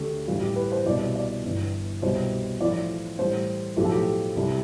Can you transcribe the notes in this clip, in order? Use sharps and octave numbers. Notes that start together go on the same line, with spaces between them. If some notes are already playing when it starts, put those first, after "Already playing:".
Already playing: D2 D3 A3 G4
A1 A2 E3 G3 F4
G4
B4
C5
C2 B2 G3 D5
D5
G1 G2 E3
C2 B2 G3 C5
A1 A2 F3 D5
A1 A2 G3 C5
B1 A2 F3 A3 G4
A4
G4
C2 C3 G3